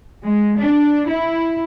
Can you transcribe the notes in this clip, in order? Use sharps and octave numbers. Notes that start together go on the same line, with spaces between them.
G#3
D4
E4